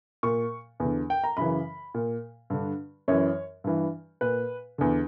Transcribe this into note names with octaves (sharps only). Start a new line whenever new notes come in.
A#2 C#6
E2 D3
G5
A#5
F#2 C#3 E3 B5
A#2
G2 D3
F#2 E3 C#5
G2 E3
A#2 B4
E2 D3